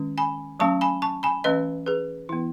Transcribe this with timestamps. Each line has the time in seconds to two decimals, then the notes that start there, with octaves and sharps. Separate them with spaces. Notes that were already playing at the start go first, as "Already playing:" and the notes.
Already playing: D#3 G#3 C#4
0.18 G#5 B5
0.60 F#3 A3 C#4 A5 C#6
0.81 G#5 B5
1.02 A5 C#6
1.23 G#5 B5
1.44 E3 A3 C#4 B4 D#5
1.86 G#4 B4
2.29 E3 B3 E4